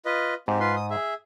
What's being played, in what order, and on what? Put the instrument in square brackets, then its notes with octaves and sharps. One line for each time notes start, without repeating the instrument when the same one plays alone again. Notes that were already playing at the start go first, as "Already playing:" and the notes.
[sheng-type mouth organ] F4 B4 D#5
[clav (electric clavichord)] G#2 [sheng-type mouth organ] C4 G4
[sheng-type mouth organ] F4 B4 C6
D#6
G#4 E5